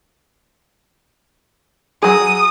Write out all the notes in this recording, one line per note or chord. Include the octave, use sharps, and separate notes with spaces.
F#3 G#4 D#6